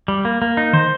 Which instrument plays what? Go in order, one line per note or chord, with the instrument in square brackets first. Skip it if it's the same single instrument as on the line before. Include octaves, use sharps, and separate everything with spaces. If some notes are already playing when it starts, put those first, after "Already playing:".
[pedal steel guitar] G3
A#3
A#3
D#4
[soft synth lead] D#3 [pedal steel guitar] C5